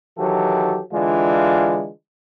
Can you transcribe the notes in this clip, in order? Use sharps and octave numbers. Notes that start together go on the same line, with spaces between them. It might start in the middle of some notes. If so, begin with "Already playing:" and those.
D#3 E3 F#3 F#4 G4 A4
D3 E3 G#3 D4 F4